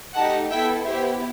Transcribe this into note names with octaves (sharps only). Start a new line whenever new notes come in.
A3 D#4 G4 F#5 A5
B3 E4 A4 E5 G5
B3 E4 G4 C5 E5